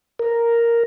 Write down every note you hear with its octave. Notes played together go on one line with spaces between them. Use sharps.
A#4